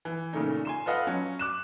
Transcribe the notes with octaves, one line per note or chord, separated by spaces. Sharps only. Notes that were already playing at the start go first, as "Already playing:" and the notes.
E3
A#2 C#3 A3 D#4
G#5 C6 E7
F4 A4 B4 D#5 F5 F#5
F#3 C#4
D6 F#6 E7